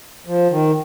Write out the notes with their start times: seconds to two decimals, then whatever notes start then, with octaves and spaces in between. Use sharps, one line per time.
0.26 F3
0.51 D#3